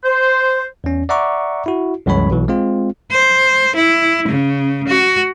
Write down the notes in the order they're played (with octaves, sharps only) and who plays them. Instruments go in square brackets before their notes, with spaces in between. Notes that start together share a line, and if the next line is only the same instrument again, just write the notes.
[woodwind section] C5
[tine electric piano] E2 C#4
D5 E5 F#5 A#5 C#6 D6
E4 F#4
C2 F#2 E3 G#3 C#5 B5
B1 B2 E3
G#3 C4 F4
[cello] C5
E4
C#3
F#4